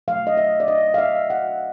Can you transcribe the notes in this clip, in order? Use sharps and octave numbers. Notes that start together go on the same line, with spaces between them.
B2 F#3 A3 F5
D#5
E5
D5
D#5
F5
E5
F#5